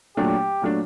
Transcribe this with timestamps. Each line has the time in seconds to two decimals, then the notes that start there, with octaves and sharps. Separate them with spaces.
0.17 A#2 F#3 A3 D4 G4
0.62 A#2 F#3 A3 D4